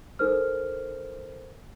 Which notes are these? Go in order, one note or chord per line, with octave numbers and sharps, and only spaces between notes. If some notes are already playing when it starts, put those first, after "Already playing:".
D#4 A4 A#4 C5 F6